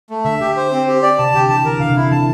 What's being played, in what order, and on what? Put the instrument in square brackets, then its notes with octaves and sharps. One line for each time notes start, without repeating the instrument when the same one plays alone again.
[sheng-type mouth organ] A3
[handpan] D3 [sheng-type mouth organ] E5
[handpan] D3 [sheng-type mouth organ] G4
[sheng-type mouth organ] C5
C4
G4
D5
[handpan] C3 [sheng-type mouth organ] A5
[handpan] D3 [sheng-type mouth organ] G4
[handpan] E3 [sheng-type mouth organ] A5
[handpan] D3 [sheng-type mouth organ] A#4
[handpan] D3 [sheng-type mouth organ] F5
[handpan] C3
[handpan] D3 [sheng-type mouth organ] E4
[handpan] E3 [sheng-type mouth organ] A5